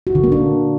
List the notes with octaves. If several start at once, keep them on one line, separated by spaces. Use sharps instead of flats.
F#4
D3
A#3
D4